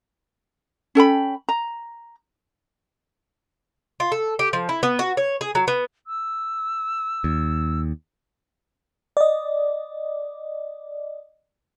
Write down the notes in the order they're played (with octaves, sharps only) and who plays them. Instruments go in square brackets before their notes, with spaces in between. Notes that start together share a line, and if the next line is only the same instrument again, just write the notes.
[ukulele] C#4 A4 G5 B5
A#5
[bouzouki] F4
A4
G4
F3
E4
B3
F#4
C#5
G#4
F#3
B3
[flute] E6
[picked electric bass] D#2
[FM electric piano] D5 D#5